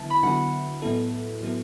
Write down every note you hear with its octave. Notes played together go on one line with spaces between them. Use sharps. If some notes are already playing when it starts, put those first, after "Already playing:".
Already playing: D3 F#3 B3 E4 A5
B5
D3 F#3 B3 E4 F#5
A2 F#3 B3 E4 A4
A2 F#3 B3 E4 A4